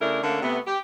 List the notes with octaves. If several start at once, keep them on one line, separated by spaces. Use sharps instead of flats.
C#3 A3 D4 E4 A#4
D3 A3 A#3 C#4 D4
C3 A3 B3
G4